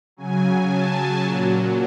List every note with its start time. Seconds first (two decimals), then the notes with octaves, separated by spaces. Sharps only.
0.17 C#3 F#3 G#5
0.69 A5
1.21 A#2 F#3